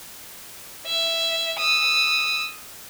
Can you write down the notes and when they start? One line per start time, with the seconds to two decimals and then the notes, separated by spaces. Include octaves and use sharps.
0.86 E5
1.59 D#6 E6